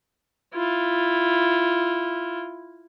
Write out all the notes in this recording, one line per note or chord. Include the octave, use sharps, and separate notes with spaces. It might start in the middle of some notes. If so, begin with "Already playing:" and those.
E4 F4